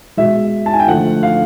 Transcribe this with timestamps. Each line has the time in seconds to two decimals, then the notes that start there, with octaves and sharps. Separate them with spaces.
0.17 B2 G#3 E5
0.66 A5
0.73 G#5
0.80 G5
0.88 D3 F3 A3 F#5
1.23 F5